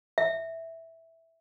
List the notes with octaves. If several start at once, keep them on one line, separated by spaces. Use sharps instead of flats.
E5